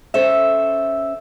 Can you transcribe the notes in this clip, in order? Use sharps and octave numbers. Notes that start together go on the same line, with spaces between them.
C#4 A4 C5 E5